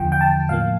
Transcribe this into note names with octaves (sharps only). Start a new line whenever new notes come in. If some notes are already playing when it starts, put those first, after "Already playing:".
Already playing: E2 D3 F3 G5
G5
A5
A2 F3 A#3 F5